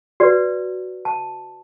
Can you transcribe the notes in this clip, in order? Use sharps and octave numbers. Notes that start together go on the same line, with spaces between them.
F#4 B4 D5
A5